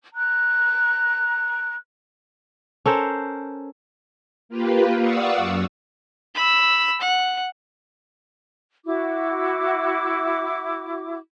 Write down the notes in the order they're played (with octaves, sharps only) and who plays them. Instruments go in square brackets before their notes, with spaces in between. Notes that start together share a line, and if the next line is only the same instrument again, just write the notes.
[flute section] A#5 F#6
[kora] C#4 A4 A#4 C5
[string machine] A#3 F4 G4 B4
D5 F5 F#5 C#6 D#6 E6
F#2
[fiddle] B5 E6
F#5
[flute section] E4 F#4 D6